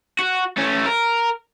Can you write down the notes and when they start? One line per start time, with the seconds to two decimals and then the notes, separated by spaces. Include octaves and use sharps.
0.19 F#4
0.57 A3 C#4
0.86 A#4